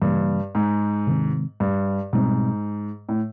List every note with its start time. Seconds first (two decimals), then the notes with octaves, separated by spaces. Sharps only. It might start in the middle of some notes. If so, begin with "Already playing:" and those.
0.02 G2 C#3 E3 G3 A#3
0.55 G#2
1.07 C3 D#3 G#3 C4
1.60 G2
2.13 G#2 B2 G3 C4
3.09 A2